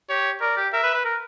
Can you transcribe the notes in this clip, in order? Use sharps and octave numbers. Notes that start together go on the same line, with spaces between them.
G4 C#5
A#4 D5
G4
A#4 E5
B4
B4
A#4